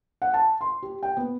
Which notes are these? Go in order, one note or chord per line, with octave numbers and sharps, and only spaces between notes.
F#5
A5
C6
G4
G5
B3